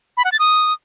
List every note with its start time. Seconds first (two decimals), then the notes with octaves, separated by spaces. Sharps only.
0.17 B5
0.24 F#5
0.32 A6
0.39 D#6